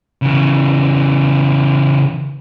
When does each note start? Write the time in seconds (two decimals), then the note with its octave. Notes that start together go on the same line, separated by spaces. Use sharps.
0.22 C#3 E3